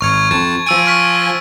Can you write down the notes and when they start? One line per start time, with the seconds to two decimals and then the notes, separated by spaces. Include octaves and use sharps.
0.01 G#1 C#6 F6 G#6 C#7
0.31 F2 A5 A6
0.66 F3 G#5 E6 D7 D#7
0.86 C#6 F6 B6